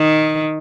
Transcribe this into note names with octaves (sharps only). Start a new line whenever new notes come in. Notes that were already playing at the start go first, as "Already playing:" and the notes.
Already playing: D#3